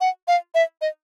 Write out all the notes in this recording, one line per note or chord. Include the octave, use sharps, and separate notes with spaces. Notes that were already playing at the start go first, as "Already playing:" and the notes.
F#5
F5
E5
D#5